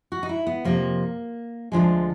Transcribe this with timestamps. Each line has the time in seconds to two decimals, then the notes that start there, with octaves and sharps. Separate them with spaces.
0.12 F#4
0.23 D#4
0.29 E4
0.46 B3
0.65 F2 C3 F3 A#3
1.72 D2 D3 F3 G#3